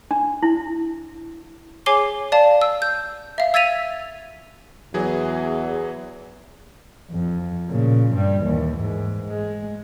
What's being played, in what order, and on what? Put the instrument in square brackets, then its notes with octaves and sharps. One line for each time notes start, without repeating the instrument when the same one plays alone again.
[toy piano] D4
E4
[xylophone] G#4 C#5 G#5 D6 C7 G7
D5 F5 A5
E6
G6
E5 F5
E6 G#6 A6 B6 D#7 F7
[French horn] E2 [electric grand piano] E3 F#3 G#4
[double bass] F2
A#2 C#3
G2 G3
D#2 E3
G#2
G#3